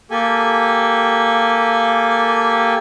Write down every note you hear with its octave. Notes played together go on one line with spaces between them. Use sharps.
A#3 G4 A4 G#5